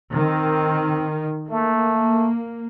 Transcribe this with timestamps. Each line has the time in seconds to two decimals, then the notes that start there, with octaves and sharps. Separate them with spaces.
0.13 D#3 C4
1.50 A3 A#3